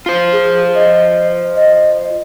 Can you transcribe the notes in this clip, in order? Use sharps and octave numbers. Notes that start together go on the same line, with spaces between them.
F4 C5
G#4
D#5
D#5